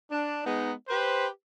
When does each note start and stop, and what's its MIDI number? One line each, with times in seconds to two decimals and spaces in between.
0.11 0.44 62
0.45 0.72 56
0.45 0.72 59
0.45 0.72 63
0.89 1.27 67
0.89 1.27 71
0.89 1.27 72